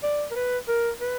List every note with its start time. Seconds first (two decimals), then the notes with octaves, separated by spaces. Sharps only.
0.03 D5
0.31 A#4
0.36 B4
0.68 A#4
1.00 B4